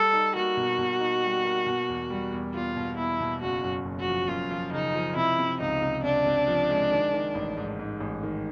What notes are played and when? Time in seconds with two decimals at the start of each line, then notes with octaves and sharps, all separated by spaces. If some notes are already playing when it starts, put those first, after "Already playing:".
Already playing: G3 A4
0.13 D#4
0.35 A#3 F#4
0.57 B2
0.79 B2
1.00 D#4
1.23 G3
1.45 A#3
1.66 B2
1.89 E2
2.10 G3
2.33 E2
2.54 E2 F4
2.76 B2
2.97 E2 E4
3.20 B2
3.41 F#1 F#4
3.64 F#2
3.85 F#1
4.00 F#4
4.07 F3
4.28 F#2 F4
4.51 F3
4.73 C#3 D#4
4.94 F3
5.16 C3 E4
5.39 C3
5.60 C#2 D#4
5.82 C3
6.04 C3 D4
6.26 C3
6.48 F3
6.70 G#3
6.91 D#3
7.13 D#3
7.35 A1
7.57 G#2
7.79 G#2
8.00 A1
8.23 D#3